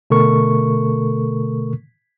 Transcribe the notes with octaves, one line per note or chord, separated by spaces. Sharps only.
B2 D3 A3 A4 A#4 C#6